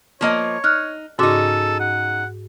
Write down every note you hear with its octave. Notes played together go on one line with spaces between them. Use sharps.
F3 A#3 C#5 D#5
D#4 F6 F#6
G#2 C#3 D#4 F#4 A4 D6
F#5